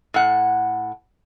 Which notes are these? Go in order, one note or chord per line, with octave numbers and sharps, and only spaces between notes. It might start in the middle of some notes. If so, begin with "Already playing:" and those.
A2 F#5